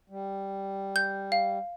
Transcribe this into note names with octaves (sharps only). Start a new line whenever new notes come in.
G3
G6
F5